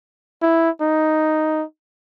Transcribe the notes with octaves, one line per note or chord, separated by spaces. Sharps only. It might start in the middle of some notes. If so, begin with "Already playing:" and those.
E4
D#4